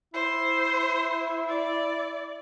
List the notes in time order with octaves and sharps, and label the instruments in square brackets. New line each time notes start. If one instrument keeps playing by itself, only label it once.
[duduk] E4 [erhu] C5
[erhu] D5